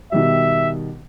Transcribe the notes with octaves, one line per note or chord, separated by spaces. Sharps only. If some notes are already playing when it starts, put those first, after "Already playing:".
B2 D#3 G3 E5